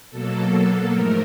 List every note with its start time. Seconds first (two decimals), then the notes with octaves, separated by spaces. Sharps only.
0.10 B2 F#3 A#3 A4
0.92 G#2 F3 A3 A#4